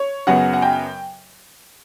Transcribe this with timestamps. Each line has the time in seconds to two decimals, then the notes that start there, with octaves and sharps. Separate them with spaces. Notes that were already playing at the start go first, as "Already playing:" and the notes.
Already playing: C#5
0.27 F#2 C#3 F#3 B3 F#5
0.53 F#5
0.62 G5